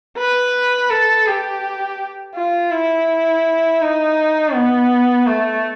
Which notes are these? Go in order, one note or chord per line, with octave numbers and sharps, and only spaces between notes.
B4
A4
G4
F4
E4
D#4
B3
A3